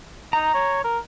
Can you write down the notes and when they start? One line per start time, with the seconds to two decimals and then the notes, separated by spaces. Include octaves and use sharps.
0.33 D#4 A#5
0.54 C#5
0.84 A#4